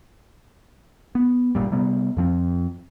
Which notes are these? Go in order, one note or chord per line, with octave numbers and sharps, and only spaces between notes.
B3
G1 C#2 A#2 G3
C3 G3 B3
F2 F3 C4